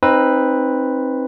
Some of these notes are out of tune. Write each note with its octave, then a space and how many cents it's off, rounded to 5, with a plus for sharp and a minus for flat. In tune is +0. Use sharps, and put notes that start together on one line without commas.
C4 +20 D#4 +0 B4 +0